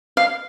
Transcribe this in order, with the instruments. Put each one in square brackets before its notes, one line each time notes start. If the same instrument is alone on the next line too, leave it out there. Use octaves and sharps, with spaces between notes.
[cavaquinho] F5